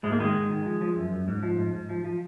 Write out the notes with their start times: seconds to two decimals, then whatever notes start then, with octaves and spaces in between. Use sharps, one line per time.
0.03 G#2 G#3
0.12 A#3
0.19 D#3 G#3
0.34 G#2
0.49 D#3
0.65 F3
0.81 F3
0.96 F#2
1.12 F#2
1.28 G#2
1.43 F3
1.58 G#2
1.73 G#2
1.89 F3
2.05 F3